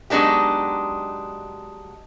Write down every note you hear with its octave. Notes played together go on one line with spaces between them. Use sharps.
F#3 G#3 B3 D4 D#4 G4